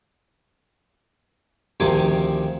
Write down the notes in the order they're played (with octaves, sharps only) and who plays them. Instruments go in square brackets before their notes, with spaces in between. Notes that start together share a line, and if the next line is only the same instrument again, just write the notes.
[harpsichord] D2 C3 D#3 F3 G#5 D6